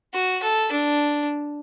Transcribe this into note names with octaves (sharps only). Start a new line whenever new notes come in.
F#4
A4
D4